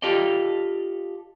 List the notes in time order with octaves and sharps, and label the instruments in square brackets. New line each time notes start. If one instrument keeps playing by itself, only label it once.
[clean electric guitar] F4 G4 A4 D5 D#5